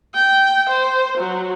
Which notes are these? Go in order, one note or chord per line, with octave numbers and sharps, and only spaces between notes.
G5
C5
F#3